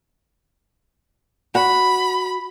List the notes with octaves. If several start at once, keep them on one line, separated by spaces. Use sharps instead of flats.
F#4 F#5 B5